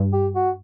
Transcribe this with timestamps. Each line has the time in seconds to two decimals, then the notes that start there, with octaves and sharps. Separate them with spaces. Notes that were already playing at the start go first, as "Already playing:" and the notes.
Already playing: G2
0.13 G4
0.35 F#4